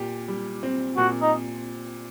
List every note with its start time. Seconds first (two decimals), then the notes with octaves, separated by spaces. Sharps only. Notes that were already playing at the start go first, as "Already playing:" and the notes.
Already playing: A#2 G4
0.28 G3
0.63 C4
0.97 A#2 F#4
1.22 D#4